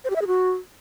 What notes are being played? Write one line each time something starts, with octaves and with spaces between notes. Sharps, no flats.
C5
G4
E5
G#4
F#4